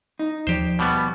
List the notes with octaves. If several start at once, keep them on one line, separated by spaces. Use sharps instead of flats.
D#4
D#2 F3 G4 C5 D5
B2 G3 B3